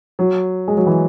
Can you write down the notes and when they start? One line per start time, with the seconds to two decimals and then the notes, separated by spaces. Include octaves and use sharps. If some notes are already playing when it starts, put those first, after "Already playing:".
0.19 F#3
0.68 G#3
0.77 F#3
0.87 E3